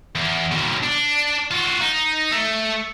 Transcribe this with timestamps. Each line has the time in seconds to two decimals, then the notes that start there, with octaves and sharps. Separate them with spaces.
0.15 E2
0.51 D#2 B2
0.83 D4
1.51 F4 F#4
1.81 D#4
2.32 A3